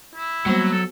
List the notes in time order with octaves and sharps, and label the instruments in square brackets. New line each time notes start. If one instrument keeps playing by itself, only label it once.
[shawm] E4
[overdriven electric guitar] F#3 [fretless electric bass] G3 A#3 [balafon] B3 F#4 C5
[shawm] A4